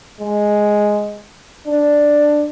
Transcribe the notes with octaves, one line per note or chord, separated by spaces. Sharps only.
G#3
D4